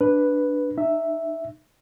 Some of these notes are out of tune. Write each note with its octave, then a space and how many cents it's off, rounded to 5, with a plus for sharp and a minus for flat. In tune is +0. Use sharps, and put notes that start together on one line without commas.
D4 +0 B4 +0
D#4 -30 E5 +0